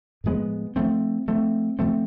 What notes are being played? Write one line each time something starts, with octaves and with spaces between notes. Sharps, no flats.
A2 F3 G#3 B3
F3 A3 C4
F3 A3 C4
F3 A3 C4